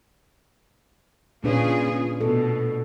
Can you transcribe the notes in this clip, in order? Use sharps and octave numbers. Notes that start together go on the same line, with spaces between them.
A#2 C#3 D4 F4 G#4 B4
B2 A4